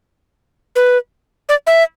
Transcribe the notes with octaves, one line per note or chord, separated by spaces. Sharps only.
B4
D5
E5